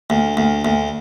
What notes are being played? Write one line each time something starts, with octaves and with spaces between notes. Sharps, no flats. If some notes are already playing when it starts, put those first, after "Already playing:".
D2
D2
D2